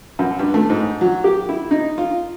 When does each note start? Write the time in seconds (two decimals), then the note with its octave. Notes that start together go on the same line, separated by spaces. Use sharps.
0.19 F#2
0.39 G2
0.54 A3
0.70 G#2
1.01 F#3
1.24 G4
1.49 E4
1.71 D#4
1.98 F4